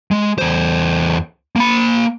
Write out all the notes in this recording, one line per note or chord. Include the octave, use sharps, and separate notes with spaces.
G#3
E2 C5
A#3 B5